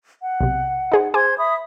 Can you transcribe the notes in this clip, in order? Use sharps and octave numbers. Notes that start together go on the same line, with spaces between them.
F#5
B1 C3
D#4 G#4 C5
G#4 C5 G#5 C6 D6 G#6
E5 B5 D#6